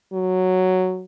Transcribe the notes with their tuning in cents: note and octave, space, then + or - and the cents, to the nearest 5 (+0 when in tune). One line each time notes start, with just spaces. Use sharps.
F#3 +0